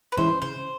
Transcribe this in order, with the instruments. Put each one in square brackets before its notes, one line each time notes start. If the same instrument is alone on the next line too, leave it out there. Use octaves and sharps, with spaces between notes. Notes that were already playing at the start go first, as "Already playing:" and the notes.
[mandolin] B4
[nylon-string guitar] E3 G#3 C#4 E4 [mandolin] C5
[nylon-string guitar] C#3 [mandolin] C5